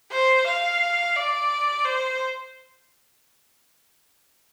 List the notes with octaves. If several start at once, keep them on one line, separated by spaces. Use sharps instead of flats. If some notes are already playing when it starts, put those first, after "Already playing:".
C5
F5
D5
C5